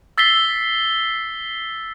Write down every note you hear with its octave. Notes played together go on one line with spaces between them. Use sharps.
E6 A6 B6 C7 G7